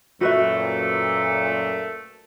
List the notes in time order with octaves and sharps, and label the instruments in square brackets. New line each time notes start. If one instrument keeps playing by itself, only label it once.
[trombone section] F#2 A#2 [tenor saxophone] A3 [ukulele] F#4 B4 E5